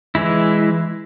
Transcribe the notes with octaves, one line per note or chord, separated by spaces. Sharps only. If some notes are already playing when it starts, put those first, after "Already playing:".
E3 G#3 E4